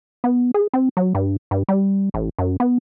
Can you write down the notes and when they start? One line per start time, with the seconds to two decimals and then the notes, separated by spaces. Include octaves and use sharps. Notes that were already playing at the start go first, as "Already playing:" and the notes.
0.24 B3
0.54 G#4
0.73 C4
0.97 F#3
1.15 G2
1.51 G2
1.69 G3
2.14 A1
2.39 F#2
2.60 B3